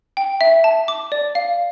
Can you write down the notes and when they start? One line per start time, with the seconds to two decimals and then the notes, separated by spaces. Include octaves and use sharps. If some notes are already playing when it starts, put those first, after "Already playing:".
0.17 G5
0.41 E5
0.64 A5
0.88 D6
1.12 D5
1.35 F5